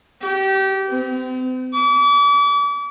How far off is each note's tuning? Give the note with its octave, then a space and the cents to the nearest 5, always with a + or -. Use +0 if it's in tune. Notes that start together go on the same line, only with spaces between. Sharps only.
G4 -25
C4 -40
D6 -40